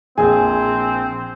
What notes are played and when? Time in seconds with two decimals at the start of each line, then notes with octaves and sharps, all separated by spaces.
0.18 A#1 C4 G#4 G#5